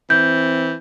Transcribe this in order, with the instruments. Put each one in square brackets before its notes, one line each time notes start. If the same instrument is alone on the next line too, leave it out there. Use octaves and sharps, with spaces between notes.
[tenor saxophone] E3 [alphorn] C4 [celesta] G6